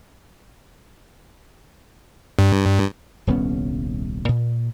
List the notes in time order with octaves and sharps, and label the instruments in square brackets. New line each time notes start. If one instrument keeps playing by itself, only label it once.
[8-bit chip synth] G2
[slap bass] D#1 C2 B3 C#4
A#2